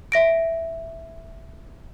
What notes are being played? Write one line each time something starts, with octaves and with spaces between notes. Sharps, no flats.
E5 A#6 D7